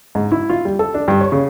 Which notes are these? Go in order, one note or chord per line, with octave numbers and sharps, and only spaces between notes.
G#2
E4
F4
G3
A4
D4
G2
C#5
C#3